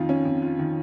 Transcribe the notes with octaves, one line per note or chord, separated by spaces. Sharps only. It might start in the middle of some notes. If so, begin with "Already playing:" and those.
Already playing: F2 D#3 F4
C#4
F2
F4
D#3